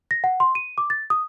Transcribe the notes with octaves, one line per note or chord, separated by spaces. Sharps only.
A#6
F#5
C6
D#7
D6
A6
D#6